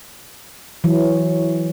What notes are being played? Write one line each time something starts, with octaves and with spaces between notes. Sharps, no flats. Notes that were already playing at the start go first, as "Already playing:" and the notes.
E3 F#3